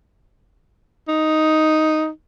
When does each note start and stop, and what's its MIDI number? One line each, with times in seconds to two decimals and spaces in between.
1.08 2.09 63